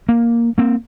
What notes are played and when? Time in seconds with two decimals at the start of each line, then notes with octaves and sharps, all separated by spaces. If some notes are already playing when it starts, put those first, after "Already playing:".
0.09 A#3
0.58 A#3 C4